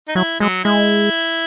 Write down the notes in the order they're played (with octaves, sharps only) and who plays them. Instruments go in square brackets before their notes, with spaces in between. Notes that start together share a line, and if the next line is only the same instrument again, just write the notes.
[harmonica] D#4
[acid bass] F#3 [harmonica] E4
[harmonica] F#3 [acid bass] G#3
[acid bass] G#3 [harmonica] E4